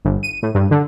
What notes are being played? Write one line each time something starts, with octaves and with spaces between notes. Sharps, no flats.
G1
D#7
A2
G2
D3